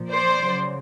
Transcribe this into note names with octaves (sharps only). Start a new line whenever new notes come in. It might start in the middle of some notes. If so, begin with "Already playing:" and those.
Already playing: A#2 F3
C5 D5
C#3 F#3